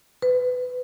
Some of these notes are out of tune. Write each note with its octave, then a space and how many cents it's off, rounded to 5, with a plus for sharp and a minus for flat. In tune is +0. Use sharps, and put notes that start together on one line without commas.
B4 +20